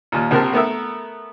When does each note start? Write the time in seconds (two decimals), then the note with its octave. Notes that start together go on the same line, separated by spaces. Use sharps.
0.12 D#2 A#2
0.31 A#1 C3 A#4 A5 F6
0.53 A3 B3 A#4 E5